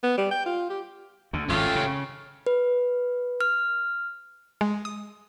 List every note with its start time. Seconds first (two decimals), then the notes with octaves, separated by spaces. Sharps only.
0.03 B3
0.17 G3
0.31 G5
0.46 F4
0.70 G4
1.33 D2 D3
1.49 G#1 F2 A3 C#4 F4 G4
1.75 C#3
2.47 B4
3.41 F6
4.61 G#3
4.85 D#6